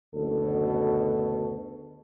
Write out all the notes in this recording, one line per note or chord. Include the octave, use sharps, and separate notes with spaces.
F#1 D2 B2 A4